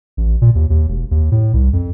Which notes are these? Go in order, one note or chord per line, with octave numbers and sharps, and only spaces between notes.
A1
A#2
D#2
D#2
E1
D#2
A2
C2
F2